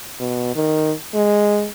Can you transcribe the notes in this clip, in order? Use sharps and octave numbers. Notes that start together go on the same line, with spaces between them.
B2
D#3
G#3